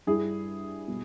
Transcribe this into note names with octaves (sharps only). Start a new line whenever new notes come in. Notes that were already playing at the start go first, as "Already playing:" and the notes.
G2 G3 E4 G#4
B2 G3